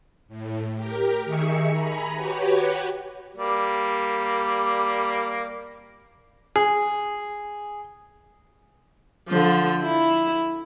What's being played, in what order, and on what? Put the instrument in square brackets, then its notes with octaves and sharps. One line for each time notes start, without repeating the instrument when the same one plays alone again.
[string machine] A2
G4 A#4
D#3 D#4 G#4 E5 C#6 C#7
G#5 A#5 B5
F#4 G4 B4 C#5
[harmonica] G3 A#3
[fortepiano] G#4
[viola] D3 F3
E4